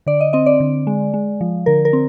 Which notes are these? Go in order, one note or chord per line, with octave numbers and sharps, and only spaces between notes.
D3 D5
D#5
C4 D#5
D5
D3
G#3
G#3
F3
D3 A#4
A#4
C4